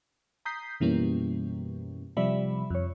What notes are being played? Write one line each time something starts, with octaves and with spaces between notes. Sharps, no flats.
A#5 D#6 G6 B6 C7
F#2 B2 E3 G3 A#3 C#4
C3 F3 G3 D5 E5 B5
F2 C#5